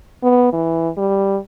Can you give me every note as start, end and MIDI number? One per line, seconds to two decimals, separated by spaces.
0.23 0.50 59
0.53 0.89 52
0.97 1.37 55